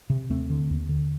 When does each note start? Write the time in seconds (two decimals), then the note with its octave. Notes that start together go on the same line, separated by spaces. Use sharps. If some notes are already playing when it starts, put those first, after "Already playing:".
0.10 C3
0.30 D#2 A3 C4
0.50 D3
0.70 D#2
0.89 D3